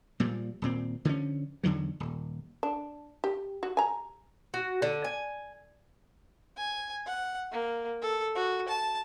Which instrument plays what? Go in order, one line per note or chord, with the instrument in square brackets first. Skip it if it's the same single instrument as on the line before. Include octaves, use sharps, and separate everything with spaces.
[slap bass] A#2 F3 G3
D#1 A#2 C4
D3 F3 A3 C#4
E2 D3 D#3 F#3
D#1
[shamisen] D4
G4
F#4
G#5 A#5
[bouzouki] F#4
D3
G#5
[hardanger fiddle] G#5
F#5
A#3
A4
F#4
A5